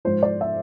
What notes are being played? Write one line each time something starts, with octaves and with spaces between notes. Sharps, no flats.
G#2 F3 C5
D5
E5